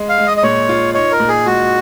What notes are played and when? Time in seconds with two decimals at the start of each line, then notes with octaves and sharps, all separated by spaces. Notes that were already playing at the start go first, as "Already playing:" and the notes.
Already playing: G#3
0.09 F5
0.18 G#3
0.27 D#5
0.37 D#5
0.43 A#2 C#5
0.69 F4
0.94 D#4 C#5
1.12 A#4
1.20 A#2
1.29 G#4
1.46 G#3 F#4